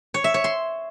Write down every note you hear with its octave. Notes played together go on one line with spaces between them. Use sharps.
C#5
E5
C#5
C6